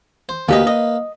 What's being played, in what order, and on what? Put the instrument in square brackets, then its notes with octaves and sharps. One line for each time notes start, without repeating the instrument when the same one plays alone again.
[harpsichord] C5
[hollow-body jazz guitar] D2 G4 D#5 [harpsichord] A#3 B4
[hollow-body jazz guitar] D#5